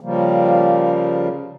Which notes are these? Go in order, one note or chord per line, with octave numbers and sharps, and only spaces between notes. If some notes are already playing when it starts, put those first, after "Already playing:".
C#3 F3 G3 A#3